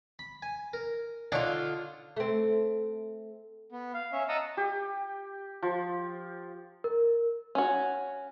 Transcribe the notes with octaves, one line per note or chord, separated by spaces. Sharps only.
B5
G#5
A#4
D3 D4 D#4 F4 C#5
A3 C4
B3
F5
C#4 C#5 E5
D#5 F#5 A5 A#5 D#6 E6
G4
F3
A#4
C#4 F#4